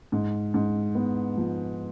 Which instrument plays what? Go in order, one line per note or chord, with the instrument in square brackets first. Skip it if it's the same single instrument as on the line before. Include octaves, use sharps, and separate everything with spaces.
[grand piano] G#2
G#2
B3
F3